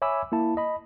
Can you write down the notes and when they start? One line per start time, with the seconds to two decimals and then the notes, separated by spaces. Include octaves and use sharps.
0.02 C#5 E5 G#5 B5 D6 E6
0.32 A#3 E4 A5
0.57 D#5 B5